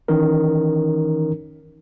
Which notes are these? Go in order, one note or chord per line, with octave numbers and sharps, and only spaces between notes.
D#3 E3 C#4 D#4 A#4